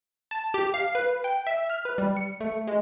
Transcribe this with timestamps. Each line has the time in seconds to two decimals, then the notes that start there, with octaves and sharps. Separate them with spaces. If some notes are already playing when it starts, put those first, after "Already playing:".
0.31 A5
0.54 G4
0.74 F5
0.95 B4
1.24 G5
1.47 E5
1.70 F6
1.85 B4
1.98 G3
2.17 C#7
2.41 A3
2.67 G#3